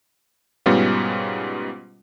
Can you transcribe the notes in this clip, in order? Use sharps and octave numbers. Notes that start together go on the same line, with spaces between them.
G#2 B2 G3 B3 C#4 F4